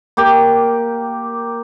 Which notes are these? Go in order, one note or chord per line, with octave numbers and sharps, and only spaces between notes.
A#3 G4